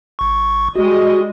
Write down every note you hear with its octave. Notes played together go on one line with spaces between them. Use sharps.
G#1 C#6
G3 G#3 F#4 D#5